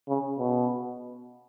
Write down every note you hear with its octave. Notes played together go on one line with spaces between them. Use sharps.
C#3
B2